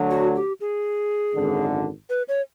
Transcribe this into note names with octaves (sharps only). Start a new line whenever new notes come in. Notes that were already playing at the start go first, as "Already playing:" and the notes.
Already playing: D2 D3 F#3
F#4
G4
G#4
G#1 F#2 D3
B4
C#5